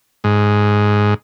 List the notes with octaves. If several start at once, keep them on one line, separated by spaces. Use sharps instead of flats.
G#2